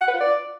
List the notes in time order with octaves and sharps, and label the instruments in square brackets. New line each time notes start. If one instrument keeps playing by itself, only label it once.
[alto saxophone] F#5
B4
F4
D5